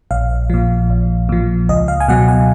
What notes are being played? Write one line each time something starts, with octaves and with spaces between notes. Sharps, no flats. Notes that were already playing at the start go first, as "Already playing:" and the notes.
A#1 F5
A#2 F3
A#1
A#2 F3
C#2 D#5
F5
G#5
B2 F#3 F#5
G#5